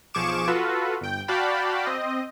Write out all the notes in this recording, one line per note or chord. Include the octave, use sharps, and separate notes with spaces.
B1 F3 G#4 C#6 D6 E7
F4 F#4 A4 B4
G1 G5
F#4 D5 F5 G5 A5 B5
C4 D#5